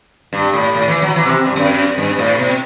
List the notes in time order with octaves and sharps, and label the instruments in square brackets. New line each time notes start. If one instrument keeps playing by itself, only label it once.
[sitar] G2
A2
A2
E3
F#3
E3
C3
G2
F#2
G2
A2
B2